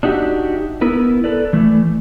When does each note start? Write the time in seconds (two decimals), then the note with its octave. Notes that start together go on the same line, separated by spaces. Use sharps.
0.03 D4 D#4 F#4 G4 E5
0.81 B3 E4 A#4 B4
1.24 A4 B4 D5
1.53 E3 A3